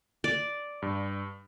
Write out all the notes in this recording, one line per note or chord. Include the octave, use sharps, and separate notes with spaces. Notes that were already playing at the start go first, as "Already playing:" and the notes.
D5
G2